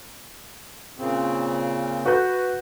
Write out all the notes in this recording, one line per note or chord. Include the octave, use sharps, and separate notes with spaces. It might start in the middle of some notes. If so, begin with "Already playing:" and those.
A#2 C#3 C4
F#4 B4 G6